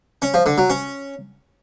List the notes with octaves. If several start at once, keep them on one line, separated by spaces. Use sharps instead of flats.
C#4
F3
D3
F#3
C#4